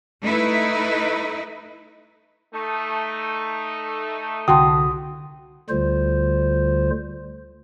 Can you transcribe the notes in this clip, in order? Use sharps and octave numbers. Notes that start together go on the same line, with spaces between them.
A3 D#4 E4 B4
A3 D#4
C2 D3 F#4 G5 A5 C6 D#6
D2 D3 G3 F4 C5